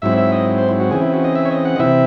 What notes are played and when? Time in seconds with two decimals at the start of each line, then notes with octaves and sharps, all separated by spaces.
0.02 G#2 F#3 C4 E4 E5
0.18 E5
0.32 D#5
0.58 C5
0.69 E4
0.80 F#4
0.91 C#3 E3 C4 G#4
1.02 E4
1.13 F#4
1.24 D#5
1.35 E5
1.45 C#5
1.50 D#5
1.65 F#5
1.76 D#5
1.79 C3 E3 C4 E4 E5